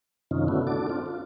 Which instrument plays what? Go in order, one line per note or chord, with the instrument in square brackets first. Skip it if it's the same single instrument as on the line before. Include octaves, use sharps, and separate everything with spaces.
[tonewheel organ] F#2 C3 D#3 C#4 D#4 F4
D3 A3 B3 C#4 E4 F#4
D4 F#4 A4 D6
C4 D4 F4
F4